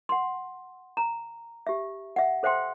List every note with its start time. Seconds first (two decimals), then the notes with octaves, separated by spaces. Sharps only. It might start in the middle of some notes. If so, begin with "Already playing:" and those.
0.09 F#5 C6
0.97 A#5
1.67 G4 E5
2.16 E5 F#5
2.43 A4 C5 E5 F#5 G5 C6